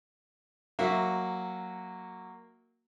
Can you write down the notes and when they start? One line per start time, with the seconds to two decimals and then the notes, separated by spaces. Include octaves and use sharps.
0.79 F#3 A#3 F#4 E5